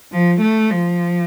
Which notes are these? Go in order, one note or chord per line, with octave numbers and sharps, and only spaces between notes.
F3
A3
F3